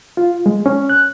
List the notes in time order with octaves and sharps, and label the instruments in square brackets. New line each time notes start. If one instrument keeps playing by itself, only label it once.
[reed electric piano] F4
G#3
C#4
F#6